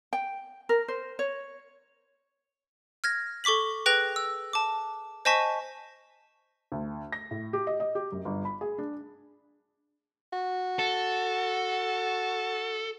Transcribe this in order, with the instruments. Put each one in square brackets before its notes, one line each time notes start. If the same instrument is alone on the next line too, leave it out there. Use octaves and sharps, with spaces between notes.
[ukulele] G5
A#4
C5
C#5
[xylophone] F6 G#6 A#6
A4 C#6 D6 B6 F#7
G#4 B4 G5 F#6 A#6 F7
E6
A5 D6
C5 D#5 G#5 A5 C#6 B6
[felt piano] D2
A#6
A2
G4
D#5
D#5
G4
F#2
G1
B5
G#4
D4
[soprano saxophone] F#4
[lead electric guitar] A4